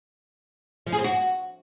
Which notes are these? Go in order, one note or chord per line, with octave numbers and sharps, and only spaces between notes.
F3
G#4
C4
F#4